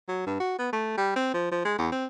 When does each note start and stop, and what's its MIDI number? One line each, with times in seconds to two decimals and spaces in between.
0.08 0.26 54
0.26 0.39 43
0.40 0.54 66
0.59 0.72 59
0.73 0.93 57
0.97 1.12 55
1.16 1.32 60
1.34 1.51 53
1.51 1.62 53
1.65 1.74 56
1.78 1.90 40
1.92 2.06 60